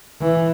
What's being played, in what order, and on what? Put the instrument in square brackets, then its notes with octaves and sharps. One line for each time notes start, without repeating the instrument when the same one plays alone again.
[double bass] E3